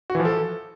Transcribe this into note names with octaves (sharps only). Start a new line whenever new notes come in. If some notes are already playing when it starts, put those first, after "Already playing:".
F#4
E3
F3
A4